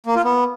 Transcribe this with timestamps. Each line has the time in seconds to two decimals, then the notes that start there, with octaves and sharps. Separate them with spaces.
0.06 A#3
0.15 F4
0.24 B3